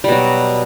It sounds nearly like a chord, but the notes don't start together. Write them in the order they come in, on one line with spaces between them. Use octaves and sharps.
G3 B2 F#3